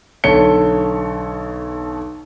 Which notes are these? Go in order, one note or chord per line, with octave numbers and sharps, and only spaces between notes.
B1 D3 A4 C#5 C#7 G7